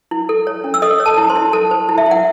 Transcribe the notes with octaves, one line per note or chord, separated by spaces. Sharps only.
E4
A4
C#5
C#4
E6
A4 D#5 D#6
C#5
A4 A5
E4
C5 C6
E4
A4 A5
C5
E4
E5
E4 F#5